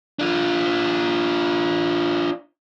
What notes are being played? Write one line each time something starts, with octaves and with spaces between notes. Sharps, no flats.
D4 F4